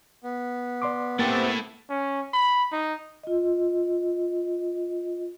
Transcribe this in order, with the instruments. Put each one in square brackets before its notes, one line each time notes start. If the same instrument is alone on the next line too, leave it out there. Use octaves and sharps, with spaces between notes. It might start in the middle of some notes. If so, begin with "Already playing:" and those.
[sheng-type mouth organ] B3
[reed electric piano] D5 C6 D6
[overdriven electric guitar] A3 E4 [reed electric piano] A#3 A6 [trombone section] C4 G4
[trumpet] C#4
B5
D#4
[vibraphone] F4 D#5